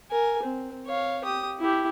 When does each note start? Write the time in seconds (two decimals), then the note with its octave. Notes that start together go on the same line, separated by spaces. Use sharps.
0.10 A#4 G#5
0.43 C4
0.86 C#5 F5
1.24 G4 D#6
1.59 E4 G4